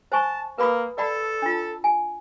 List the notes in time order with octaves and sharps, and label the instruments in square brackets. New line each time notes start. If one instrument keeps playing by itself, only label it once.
[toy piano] C5 G#5 C#6 [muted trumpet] A5
[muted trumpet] A#3 [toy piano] B4 B5 D#6
[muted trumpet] A4 [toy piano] D5 F#5 B5
[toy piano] D4 F4
G#5